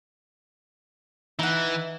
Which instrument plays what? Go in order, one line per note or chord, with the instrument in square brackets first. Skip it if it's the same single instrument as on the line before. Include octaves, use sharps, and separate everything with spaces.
[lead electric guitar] E3 [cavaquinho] D#4 F#5